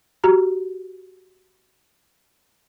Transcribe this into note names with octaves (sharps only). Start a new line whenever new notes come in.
F#4 G4 A#5